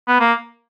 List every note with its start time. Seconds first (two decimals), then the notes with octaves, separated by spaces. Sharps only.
0.08 B3
0.20 A#3